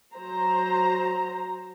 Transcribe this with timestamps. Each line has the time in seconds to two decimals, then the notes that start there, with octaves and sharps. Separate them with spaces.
0.13 F#3 C5 A#5